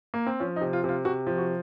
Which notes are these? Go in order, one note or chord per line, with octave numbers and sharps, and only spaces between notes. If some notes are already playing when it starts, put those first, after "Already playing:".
A#3
C4
F3 C#4
D#4
C3
F4
C3
F4
C3 F#4
F3
F#4